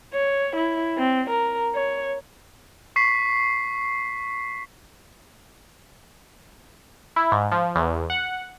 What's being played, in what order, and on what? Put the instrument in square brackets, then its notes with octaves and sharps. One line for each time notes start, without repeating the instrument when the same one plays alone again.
[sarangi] C#5
E4
C4
A#4
C#5
[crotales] C#6 B6 C7
[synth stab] E4
G#2
F3
E2
F#5